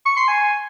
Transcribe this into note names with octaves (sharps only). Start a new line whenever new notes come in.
C#6
C6
G#5